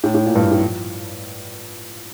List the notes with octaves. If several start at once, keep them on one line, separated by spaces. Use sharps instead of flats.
A2
A2
A#2
G2
A2
F3